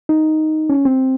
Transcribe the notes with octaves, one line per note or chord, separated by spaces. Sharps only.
D#4
C#4
C4